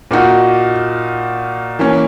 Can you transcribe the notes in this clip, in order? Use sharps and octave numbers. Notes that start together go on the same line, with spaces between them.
A#2 A#3 D#4 F#4
E3 A#3 C#4